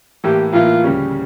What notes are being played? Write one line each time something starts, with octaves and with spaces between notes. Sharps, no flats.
A2 E3 A#3 E4 G4
A2 E3 A#3 E4 F4
D2 C#3 G3 C#4